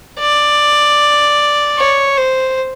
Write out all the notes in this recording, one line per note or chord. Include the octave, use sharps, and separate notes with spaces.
D5
C#5
C5